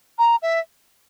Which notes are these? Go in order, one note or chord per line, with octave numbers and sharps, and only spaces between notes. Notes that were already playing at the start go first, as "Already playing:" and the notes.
A#5
E5